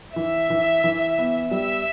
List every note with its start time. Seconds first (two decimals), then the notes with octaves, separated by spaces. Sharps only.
0.16 E3 E5
0.50 E3
0.84 E3
1.18 B3
1.51 G3 E5